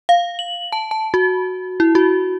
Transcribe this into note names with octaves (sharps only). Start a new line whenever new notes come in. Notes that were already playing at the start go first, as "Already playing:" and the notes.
F5
F#7
A5
A5
F#4
E4
F#4